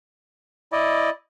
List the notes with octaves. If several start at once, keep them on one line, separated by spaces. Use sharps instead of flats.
E4 D5 D#5